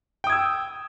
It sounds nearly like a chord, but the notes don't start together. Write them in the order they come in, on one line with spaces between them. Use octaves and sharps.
G5 D#6 G#6 E6